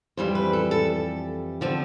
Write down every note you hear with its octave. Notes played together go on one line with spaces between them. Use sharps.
F2 E3 G3 C5
B4
A4
A4
D3 F3 C4